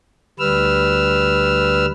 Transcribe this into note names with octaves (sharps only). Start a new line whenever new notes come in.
D2 G3 B4 E6 F6